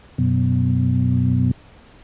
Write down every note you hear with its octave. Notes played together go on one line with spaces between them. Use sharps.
F#2 B2